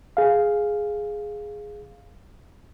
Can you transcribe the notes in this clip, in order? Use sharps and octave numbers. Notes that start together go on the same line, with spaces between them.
G#4 F5